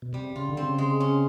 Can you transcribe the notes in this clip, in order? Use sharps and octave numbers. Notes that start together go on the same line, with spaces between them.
B2
C3 G3
C#3 F4
D3
C4
C#3
G#3
C#4